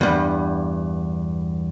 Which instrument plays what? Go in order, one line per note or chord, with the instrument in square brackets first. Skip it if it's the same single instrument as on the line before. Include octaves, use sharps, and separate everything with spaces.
[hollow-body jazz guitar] E2 G2